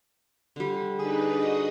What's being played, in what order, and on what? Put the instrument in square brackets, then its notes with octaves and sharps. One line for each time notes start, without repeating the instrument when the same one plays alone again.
[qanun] D3 G3
[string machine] D4 D#4 B4 [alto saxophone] G#4
[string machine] F#4 D#5 D#6